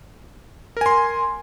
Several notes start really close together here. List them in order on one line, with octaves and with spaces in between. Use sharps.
A#4 G#5 C6